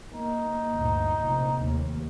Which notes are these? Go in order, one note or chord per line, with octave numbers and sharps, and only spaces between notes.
A#3 D#4
D2 G2 A#2
F1 A#1
D#2